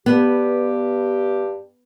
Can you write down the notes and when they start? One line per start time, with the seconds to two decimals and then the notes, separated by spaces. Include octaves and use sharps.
0.06 G2 B3 G4